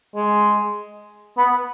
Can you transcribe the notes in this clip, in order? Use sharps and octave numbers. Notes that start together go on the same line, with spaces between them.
G#3
B3